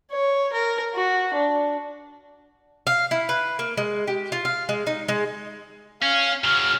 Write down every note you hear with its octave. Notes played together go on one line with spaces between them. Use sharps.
C#5
A#4
F#4
D4
F5
E4
B4
A#3
G#3
G4
F4
F5
G#3
D#4
G#3
C#4 F5
C#3 F#3 F6